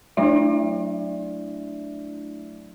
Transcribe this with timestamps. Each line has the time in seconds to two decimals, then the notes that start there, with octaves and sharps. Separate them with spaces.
0.17 F#3 A3 D4 E4 D5 E5